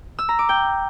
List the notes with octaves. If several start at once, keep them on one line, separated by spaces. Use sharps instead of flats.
E6
A#5
D6
G5